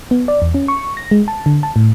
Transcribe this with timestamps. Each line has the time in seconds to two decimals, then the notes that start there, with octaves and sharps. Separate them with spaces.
0.11 B3
0.28 D5
0.42 E2
0.54 C#4
0.68 C#6
0.97 A#6
1.11 G#3
1.28 A5
1.46 D3
1.63 A5
1.76 A2